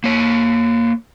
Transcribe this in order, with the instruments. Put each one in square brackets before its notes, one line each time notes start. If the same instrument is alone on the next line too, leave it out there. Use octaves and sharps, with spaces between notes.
[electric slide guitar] A#3 C#5